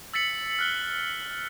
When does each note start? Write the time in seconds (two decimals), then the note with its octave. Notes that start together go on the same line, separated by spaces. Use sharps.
0.14 E6 A6 B6 C#7 F#7
0.59 F6 F#6 G7